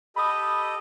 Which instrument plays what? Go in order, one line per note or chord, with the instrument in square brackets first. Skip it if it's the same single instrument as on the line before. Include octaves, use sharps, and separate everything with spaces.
[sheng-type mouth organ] G4 A4 D#5 [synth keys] B5 D#6